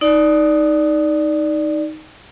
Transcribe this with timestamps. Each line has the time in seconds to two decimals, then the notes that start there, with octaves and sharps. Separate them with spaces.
0.01 D#4 D5